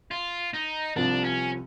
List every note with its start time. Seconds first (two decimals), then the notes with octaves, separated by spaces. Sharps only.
0.11 F4
0.54 D#4
0.96 C2 C3 F3 D4
1.24 C#4